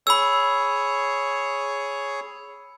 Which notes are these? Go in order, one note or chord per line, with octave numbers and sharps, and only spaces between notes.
G#4 C#5 B5 E6